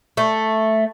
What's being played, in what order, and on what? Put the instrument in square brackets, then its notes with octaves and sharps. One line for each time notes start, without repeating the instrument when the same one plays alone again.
[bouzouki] A3